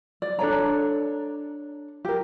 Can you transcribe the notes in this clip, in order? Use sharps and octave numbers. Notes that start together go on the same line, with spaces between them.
D5
D4 A4 C#5 A#5
G4 A#4